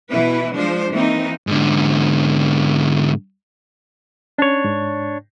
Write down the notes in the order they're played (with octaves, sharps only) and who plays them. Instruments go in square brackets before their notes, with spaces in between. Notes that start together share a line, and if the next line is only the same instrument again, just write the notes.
[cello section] B2 E3 E4 B4
F3 G#3 D4 C5
E3 A#3 C4 D#4
[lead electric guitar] G#2 D3
[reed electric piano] C#4 [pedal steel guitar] D4 C#5
[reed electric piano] G#2